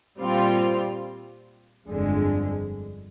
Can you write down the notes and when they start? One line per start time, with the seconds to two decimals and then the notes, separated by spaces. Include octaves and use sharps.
0.18 A#2 G3 C4 F4
1.88 G1 F2 D3 G#3